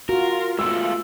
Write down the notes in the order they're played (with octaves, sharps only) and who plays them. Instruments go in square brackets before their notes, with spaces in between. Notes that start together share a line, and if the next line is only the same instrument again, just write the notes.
[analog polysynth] F4 [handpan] F#4 [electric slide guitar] A#4
[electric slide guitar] G#3 A3 B3 [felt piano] E6